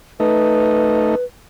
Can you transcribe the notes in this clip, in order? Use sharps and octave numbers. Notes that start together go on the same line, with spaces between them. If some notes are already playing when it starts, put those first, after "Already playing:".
A3 D#4 B4